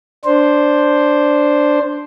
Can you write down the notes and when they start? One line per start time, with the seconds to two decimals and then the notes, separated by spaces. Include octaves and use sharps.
0.25 D4 C5